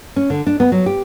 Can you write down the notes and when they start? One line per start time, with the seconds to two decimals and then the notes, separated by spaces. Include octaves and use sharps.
0.16 C#4
0.30 D3
0.47 D4
0.60 B3
0.72 F#3
0.86 G4